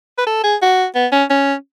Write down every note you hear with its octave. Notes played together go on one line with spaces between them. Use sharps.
B4
A4
G#4
F#4
B3
C#4
C#4